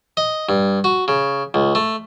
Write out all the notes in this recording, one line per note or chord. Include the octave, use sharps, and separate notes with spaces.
D#5
G2
F#4
C#3
C#2
A3